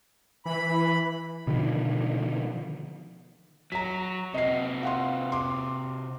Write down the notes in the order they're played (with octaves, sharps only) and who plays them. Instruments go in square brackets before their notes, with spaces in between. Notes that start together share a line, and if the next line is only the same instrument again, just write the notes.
[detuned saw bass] E3 [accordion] B5
[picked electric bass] B2 D3 D#3 F3
[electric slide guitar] F#3 [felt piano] A#5 B6
[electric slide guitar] C3 F#4 [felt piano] D#5 C7
[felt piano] F5 F#5 C6
C6 D6